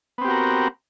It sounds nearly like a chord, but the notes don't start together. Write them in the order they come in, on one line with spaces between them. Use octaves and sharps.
B3 C4 G4 F#4 A#4